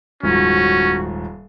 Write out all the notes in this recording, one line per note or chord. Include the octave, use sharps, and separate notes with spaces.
D#1 G#2 F3 C#4 F#4